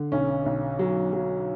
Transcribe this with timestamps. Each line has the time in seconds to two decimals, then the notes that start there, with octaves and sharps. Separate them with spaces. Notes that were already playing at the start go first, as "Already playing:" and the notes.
Already playing: D3
0.12 B1 C#4
0.46 B1
0.79 F#3
1.13 F#3